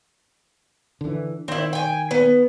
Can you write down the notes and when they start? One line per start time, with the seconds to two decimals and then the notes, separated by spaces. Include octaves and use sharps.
1.01 D3 E3
1.48 D#3 C4 E4
1.73 G5 G#5
2.11 B3